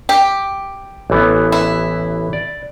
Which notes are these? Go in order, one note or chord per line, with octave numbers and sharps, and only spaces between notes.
G4
A1 E3 B3
E4
D5